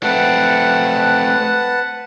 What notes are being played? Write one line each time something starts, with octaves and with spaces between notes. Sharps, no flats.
A3 C4 B4 F#5 A5